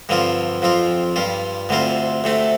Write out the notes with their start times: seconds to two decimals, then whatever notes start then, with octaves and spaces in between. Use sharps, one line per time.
0.09 G2 D3 F3 C4 F4
0.62 F2 F3 C4 F4
1.16 G2 G3 F4
1.69 D2 D3 G3 C4 F4
2.24 D2 C3 A3 C4